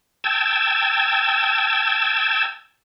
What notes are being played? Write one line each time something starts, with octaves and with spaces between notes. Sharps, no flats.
G5 A5 E6 G#6